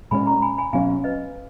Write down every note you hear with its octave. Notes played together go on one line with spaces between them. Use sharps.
A#2 G#3 C#4 G#5 B5
A#5 C#6
G#5 B5
G#5 B5
B2 F#3 C#4 F5 G#5
B4 D#5